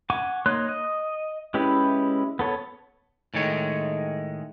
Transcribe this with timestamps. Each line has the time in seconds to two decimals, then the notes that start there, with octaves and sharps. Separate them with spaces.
0.10 F#5 G#5 C#6 D6
0.46 A#3 D#4 C#5 C6 F#6
0.69 D#5
1.54 G#3 C#4 E4 G4 B4
2.39 B3 A4 C#5
3.34 A2 D#3 G#3 C#5